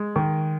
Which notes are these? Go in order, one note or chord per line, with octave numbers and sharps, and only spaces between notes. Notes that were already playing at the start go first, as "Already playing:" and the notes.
Already playing: G#3
D#3